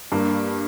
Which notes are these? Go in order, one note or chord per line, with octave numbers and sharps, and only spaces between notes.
G2 A#3